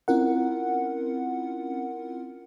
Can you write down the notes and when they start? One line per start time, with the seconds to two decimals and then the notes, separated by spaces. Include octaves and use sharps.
0.08 C4 C#4 E4 F4 A#4 F#5